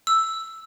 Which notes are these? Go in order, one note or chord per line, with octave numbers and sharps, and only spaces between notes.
E6